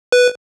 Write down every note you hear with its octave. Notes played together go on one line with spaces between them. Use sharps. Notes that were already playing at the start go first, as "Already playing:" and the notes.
B4